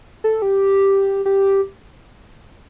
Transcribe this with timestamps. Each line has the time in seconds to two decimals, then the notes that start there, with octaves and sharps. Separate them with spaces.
0.24 A4
0.42 G4
1.26 G4